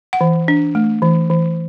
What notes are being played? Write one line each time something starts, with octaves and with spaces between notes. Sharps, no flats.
F#5
E3
D4
A3
E3
E3